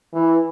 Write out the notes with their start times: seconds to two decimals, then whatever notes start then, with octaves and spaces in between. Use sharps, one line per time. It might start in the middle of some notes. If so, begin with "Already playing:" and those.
0.13 E3